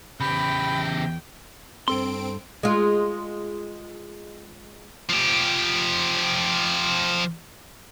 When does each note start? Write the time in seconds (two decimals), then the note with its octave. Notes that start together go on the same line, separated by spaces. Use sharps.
0.20 E2 C#3 E3 G4 G5 B5
1.88 G2 C4 A4 C6 D7
2.63 G#3 F4
5.09 F3 G4